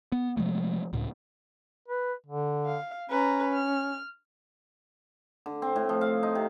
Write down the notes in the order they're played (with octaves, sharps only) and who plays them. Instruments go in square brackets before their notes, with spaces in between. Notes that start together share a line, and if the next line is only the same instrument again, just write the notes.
[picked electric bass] B3
C3 F3 G#3 A3
C#2 A2
[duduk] B4
D3
[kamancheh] F5
[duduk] C#4 [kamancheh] B4 A#5
[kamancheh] F6
[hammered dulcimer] D3
C4
A2
F3
F5
D#4
C3